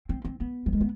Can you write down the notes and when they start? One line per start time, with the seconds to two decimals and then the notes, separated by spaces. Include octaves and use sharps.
0.09 C4
0.25 C4
0.40 B3
0.66 G3
0.73 G#3
0.80 B3